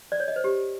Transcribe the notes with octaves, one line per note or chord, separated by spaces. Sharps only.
D5
C#5
D#5
C5
G4